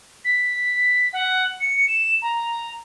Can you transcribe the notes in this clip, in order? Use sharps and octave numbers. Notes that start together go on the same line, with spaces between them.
B6
F#5
C#7
E7
A#5